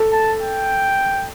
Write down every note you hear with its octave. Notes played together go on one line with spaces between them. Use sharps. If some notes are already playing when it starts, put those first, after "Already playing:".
Already playing: A4
A5
G5